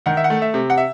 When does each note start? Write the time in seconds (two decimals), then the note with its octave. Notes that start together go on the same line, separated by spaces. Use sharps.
0.06 D#3 F#5
0.17 E5
0.24 F#5
0.30 A3
0.42 E5
0.54 C3
0.70 F#5
0.78 E5